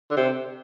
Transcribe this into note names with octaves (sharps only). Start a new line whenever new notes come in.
D3
C3